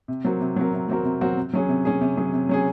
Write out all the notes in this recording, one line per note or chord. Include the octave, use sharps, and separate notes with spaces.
C3
F#3 C4 F#4 A#4
C3
F#3 C4 F#4 A#4
C3
F#3 C4 F#4 A#4
C3
F#3 C4 F#4 A#4
C3
F#3 C#4 G#4
C3
F#3 C#4 G#4
C3
F#3 C#4 G#4
C3
F#3 C#4 G#4